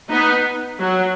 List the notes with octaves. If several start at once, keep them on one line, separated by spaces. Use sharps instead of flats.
B3 D#4
F#3